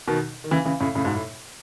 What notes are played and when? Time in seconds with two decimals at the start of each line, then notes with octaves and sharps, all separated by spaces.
0.08 B2 D#3
0.44 D#3
0.51 C#3 E3
0.66 C#3 E3
0.80 A2 C#3
0.95 A2 C#3
1.05 G#2 B2
1.14 A2